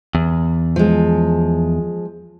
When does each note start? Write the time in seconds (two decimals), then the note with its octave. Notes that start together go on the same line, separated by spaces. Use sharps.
0.15 E2
0.76 F3 G#3